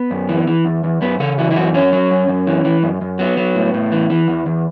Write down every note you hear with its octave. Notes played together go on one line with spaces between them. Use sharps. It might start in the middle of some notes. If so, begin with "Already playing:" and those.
Already playing: B3
F#2
E3
E3
E2
E2
F#2 B3
C#3 A4
E3 F#4
E4
F#2 F#4
F#3 C#4
F#3
F#2
F#2
E3
E3
F#2
F#2
F#3 B3
F#3
A2
A2
E3
E3
E2
E2